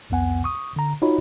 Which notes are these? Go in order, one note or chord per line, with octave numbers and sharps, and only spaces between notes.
C2 F2 B3 F#5 G#5
C#6 D#6
D3 A#5
D#4 F4 F#4 C#5 D#5 B5